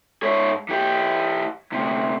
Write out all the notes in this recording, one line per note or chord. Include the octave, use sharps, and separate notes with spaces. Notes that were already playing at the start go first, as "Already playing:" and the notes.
G#2 C#5
E3 G4
D2 C3